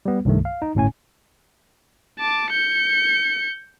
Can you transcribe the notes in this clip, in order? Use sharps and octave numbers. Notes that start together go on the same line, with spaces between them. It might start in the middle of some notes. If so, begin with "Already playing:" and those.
G3 B3
C2 G2 D#3 A3
F5
D#4
G1 A2 C#4 G#5
A5 D6
G6 C#7